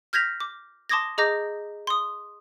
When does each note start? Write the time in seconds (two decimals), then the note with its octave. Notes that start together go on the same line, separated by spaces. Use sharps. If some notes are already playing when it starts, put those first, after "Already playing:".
0.13 F6 G6 G#6 A#6 B6 F7
0.40 D6
0.89 A5 C6 D6 D#6 G#6 A#6
1.18 G#4 D#5 A#5 D6 G6 A#6
1.87 C6 D#6